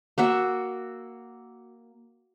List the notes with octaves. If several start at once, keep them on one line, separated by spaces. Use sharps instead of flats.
A#3 F#4 E5